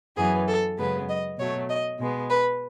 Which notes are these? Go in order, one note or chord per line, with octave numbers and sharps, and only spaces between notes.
F#2 E3 B3 G#4
A4
F#2 C#3 G#3 B3 B4
D#5
B2 F#3 A3 C#5
D#5
B2 G#3 B3
B4